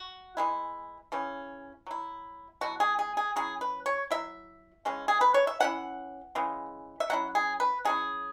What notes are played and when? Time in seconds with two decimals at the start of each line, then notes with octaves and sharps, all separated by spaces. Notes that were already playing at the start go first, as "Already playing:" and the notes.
Already playing: F#4
0.37 E3 G#3 E4
1.12 C#3 E3 C#4
1.87 F#3 E4
2.61 B2 F#3 B3 E4 F#4
2.80 G#4
2.99 G#4
3.17 G#4
3.36 F#3 C#4 E4 G#4
3.61 B4
3.86 C#5
4.11 F#3 E4 E5
4.85 C#3 E3 G#3 C#4
5.08 G#4
5.21 B4
5.34 C#5
5.47 E5
5.60 E3 C#4 E4 F#5
6.35 C#3 E3 G#3
7.00 E5
7.10 F#3 C#4 E4 F#5
7.35 G#4
7.60 B4
7.85 F#3 C#4 E4 G#4